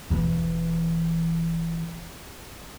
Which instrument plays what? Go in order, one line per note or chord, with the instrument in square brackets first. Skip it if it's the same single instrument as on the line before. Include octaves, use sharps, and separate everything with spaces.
[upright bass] E1 E3